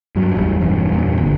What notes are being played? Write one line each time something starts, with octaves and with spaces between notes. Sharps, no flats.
G2 F#3
A1 E2 G3
E1 E2 G2
E2 G2 A#2
G1 D2 D3